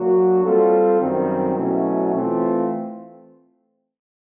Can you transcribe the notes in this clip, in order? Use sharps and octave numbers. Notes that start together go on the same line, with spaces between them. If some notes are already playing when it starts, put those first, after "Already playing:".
Already playing: F#3 A#3 D4 F#4
G3 C4 F4 A4
F#2 D#3 G3 C4
B2 F#3 A3 C#4 E4
E3 A3 C4 F4